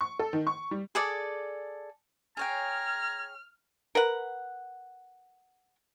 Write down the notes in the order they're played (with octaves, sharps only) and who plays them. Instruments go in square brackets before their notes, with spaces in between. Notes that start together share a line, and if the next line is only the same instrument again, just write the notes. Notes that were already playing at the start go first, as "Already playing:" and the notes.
[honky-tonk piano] C#6
A4
D#3
C#6
G3
[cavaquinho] G#4 A4 D5
[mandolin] G#4 C#5 G5 [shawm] A#5 [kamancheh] F6 [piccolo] G#6
[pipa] A#4 B4 F#5